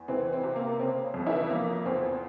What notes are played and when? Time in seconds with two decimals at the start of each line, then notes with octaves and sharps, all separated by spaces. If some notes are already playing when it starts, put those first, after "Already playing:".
Already playing: E2
0.08 E3 C4
0.33 C4
0.43 C3
0.56 A#3
0.79 C#3 C4
1.14 F2
1.27 E3 E4
1.50 F3 A#3
1.85 E2 C4